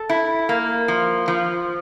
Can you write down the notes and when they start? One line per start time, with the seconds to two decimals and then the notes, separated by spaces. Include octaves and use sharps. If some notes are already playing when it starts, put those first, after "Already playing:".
Already playing: A4
0.09 E4
0.49 A#3
0.88 F3
1.28 F3